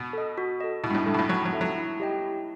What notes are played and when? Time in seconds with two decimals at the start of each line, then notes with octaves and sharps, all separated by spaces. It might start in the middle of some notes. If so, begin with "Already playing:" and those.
Already playing: B2
0.13 A4 D#5
0.38 F#4
0.60 A4 D#5
0.84 B2 E4
0.90 G2
0.95 A2
1.06 G2 A4 E5
1.14 B2
1.19 A2
1.29 F#3 E4
1.45 F#3
1.53 A4 E5
1.61 F#3
1.76 E4
2.00 G4 D#5 G5
2.22 E4